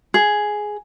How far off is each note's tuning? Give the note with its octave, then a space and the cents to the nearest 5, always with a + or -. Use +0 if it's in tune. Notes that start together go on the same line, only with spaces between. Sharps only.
G#4 +5